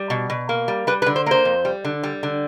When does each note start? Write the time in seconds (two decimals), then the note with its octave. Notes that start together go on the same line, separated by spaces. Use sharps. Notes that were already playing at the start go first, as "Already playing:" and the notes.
Already playing: G3
0.10 B2
0.30 B2
0.49 A#3
0.68 G3
0.87 G3 B4
1.02 B4
1.07 D3
1.16 C5
1.26 A#3 C5
1.45 F2
1.65 G3
1.85 D3
2.03 G3
2.23 D3